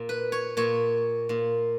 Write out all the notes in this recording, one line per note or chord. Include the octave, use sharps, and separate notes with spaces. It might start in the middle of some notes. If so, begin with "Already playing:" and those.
Already playing: A#2
B4
C#5
A#2 C#5
A#2